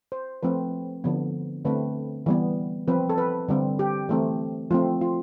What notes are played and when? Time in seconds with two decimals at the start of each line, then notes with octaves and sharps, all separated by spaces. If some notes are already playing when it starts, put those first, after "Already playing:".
0.12 C5
0.43 F3 A3 C4 B4
1.04 D3 F3 B3
1.65 D3 A3 C4 B4
2.26 E3 G3 B3
2.88 F3 C4 B4
3.09 A4
3.18 B4
3.48 D3 G3 C4
3.79 G4
4.09 E3 A3 C4
4.71 F3 A3 C4 F4
5.01 F4